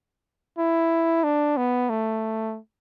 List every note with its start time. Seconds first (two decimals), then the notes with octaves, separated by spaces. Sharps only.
0.58 E4
1.24 D4
1.57 B3
1.89 A3